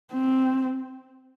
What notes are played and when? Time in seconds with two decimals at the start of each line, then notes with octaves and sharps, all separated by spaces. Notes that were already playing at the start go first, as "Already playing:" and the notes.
0.13 C4